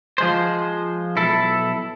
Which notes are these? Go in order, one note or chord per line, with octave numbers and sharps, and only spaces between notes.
F3 G#3 C5
B1 E4 A4